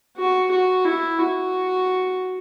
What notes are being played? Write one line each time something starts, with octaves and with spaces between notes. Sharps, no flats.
F#4
F#4
E4
F#4